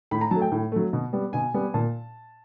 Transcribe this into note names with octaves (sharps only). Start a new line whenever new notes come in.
A2 B5
A#5
F#3 A3 A5
G5
A2
F#3 A3
B2
G3 B3
B2 G#5
G3 B3
A#2 A5